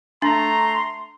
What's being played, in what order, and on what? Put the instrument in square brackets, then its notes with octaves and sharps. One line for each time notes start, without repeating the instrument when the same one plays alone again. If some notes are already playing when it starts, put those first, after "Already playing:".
[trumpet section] A3 A#5 [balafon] D4 [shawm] C6